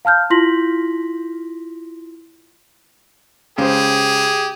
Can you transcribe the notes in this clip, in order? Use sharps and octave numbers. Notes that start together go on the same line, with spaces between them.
F5 A5 F6 G6
E4 F4 C6 A#6 B6 F#7
C#2 G4 G#4 C5